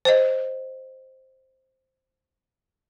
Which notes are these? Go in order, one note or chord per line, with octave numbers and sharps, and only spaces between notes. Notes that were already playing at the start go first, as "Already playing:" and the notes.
C5 D#5